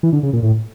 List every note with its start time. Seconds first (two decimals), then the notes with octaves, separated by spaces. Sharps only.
0.03 E3
0.13 D3
0.23 C#3
0.33 A#2
0.42 A2